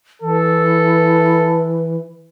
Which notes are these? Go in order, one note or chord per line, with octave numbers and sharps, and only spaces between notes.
E3 A4